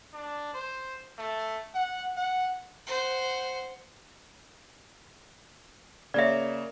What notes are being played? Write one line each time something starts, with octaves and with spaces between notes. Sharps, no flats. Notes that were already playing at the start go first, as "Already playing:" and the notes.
D4
C5
A3
F#5
F#5
C5 F#5
C#3 A#3 C#5 D5 E5